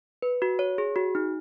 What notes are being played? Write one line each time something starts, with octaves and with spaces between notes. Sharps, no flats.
B4
F#4
C#5
G#4
F#4
D#4